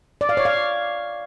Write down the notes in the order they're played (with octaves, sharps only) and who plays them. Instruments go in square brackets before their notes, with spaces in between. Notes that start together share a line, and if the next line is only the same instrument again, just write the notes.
[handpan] D5
F5
C#5
F5